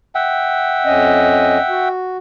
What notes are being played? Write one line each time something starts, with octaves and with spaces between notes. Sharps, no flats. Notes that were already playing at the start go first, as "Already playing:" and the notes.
E5 F#5 G5
F2 C#4 D#5
F#4